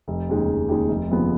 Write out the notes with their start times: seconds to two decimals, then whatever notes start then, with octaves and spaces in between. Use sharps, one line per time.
0.08 F1
0.29 D#2 C#3 G#3 D#4
0.49 F1
0.68 D#2 C#3 G#3 D#4
0.89 F1
1.09 D#2 C#3 F3 B3